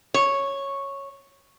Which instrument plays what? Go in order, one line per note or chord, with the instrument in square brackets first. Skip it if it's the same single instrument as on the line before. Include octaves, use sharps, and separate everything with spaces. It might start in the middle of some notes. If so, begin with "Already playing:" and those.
[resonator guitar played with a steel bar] C#5